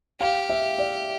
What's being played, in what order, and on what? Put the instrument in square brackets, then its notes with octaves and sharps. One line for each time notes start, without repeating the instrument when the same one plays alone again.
[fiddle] G4 [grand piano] F5
[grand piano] E5
D5